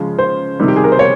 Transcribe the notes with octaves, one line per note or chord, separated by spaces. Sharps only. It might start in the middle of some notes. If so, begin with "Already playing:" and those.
Already playing: C#3 F3 G#3
C5
C3 D#3 G3
G4
G#4
A#4
C5
C#5